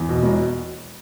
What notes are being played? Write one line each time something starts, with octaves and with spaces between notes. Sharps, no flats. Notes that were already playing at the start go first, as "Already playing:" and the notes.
Already playing: E2
B2
E1